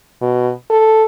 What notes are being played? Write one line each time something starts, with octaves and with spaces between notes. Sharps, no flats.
B2
A4